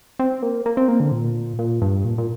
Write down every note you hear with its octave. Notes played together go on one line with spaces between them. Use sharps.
C4
A#3
A#3
C4
A#3
D3
A#2
A#2
G2
A#2
A#2